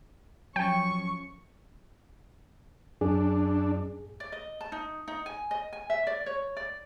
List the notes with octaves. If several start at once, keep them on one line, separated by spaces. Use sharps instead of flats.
F3 F#3 C#4 G5 C#6
F#2 D4 G#4
D5
D#5
A5
D#4
D#4
G#5
D#5
G#5
E5
D5
C#5
D5